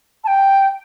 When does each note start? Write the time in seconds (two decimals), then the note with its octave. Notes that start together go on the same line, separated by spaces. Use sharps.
0.24 A5
0.27 G5